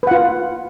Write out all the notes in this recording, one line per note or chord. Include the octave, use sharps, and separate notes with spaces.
F4 B4 F#5